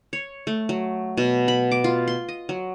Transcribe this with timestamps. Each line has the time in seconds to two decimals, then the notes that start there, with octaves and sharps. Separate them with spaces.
0.13 C#5
0.47 A3
0.69 F#3
1.17 B2
1.48 B5
1.71 D6
1.84 F4
2.08 C6
2.29 D#5
2.49 F#3